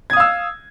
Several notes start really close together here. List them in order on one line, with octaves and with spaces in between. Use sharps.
G#6 D#6 F5 E6